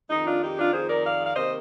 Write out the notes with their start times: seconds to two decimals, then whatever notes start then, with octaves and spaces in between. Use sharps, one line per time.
0.10 F2 D#3 G#3 D#4
0.26 D4 F4
0.42 D#4 G4
0.58 D4 F4
0.73 G#4 C5
0.88 A#4 D5
1.04 D5 F5
1.25 F5
1.36 C3 D#3 A#3 C5 D#5